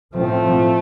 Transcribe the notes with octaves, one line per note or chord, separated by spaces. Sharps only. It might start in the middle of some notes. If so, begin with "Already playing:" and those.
A2 F3 A3 C4